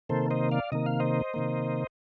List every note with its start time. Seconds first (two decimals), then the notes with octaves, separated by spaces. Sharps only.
0.09 C3 D#3 A#3 A4 C5
0.30 C5 D#5
0.51 D5 F5
0.72 C3 D#3 A#3 D#5
0.86 F5
1.00 C5 D#5
1.34 C3 D#3 A#3